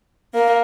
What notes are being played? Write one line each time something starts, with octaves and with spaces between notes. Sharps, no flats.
A#3